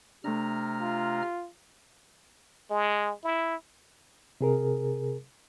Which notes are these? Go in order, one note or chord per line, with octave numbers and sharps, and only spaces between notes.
C3 A3 D4 A#5 F6
F4
G#3
E4
C3 G#4 A#4